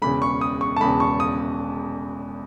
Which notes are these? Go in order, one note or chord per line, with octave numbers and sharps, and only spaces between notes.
E1 E2 C#3 B5
C#6
D#6
C#6
A5
E1 E2 C#3 B5
C#6
D#6